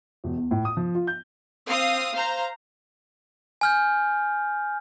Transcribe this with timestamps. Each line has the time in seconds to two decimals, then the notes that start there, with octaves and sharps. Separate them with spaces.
0.24 E1
0.37 E2
0.51 A2
0.65 D#6
0.77 F3
0.95 F4
1.07 G6
1.67 C4 F5 D#6
2.14 C5 F5 A#5
3.61 G#5 F6 G6